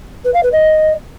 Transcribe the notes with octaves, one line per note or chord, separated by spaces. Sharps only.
B4
F5
B4
D#5